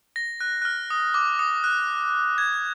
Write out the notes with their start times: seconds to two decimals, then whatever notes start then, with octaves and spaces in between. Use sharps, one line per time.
0.16 A#6
0.41 F#6
0.62 F#6
0.65 F6
0.90 D#6
1.14 D6
1.39 D#6
1.64 F#6
2.38 G#6